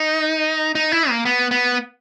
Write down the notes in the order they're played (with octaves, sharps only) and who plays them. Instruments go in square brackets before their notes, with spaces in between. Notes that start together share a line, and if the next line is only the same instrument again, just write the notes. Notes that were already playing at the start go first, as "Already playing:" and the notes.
Already playing: [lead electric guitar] D#4
D#4
E4
A#3
B3
B3